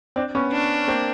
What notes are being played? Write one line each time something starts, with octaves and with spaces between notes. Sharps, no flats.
C4 D4
B3 C#4
D4
A#3 C4